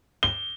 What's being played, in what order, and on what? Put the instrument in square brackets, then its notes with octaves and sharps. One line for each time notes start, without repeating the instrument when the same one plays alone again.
[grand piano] G7